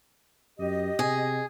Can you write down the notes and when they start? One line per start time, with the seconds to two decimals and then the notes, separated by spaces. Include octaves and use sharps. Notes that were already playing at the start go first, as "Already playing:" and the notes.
0.59 F#2 G4 D#5
0.99 C3 G#4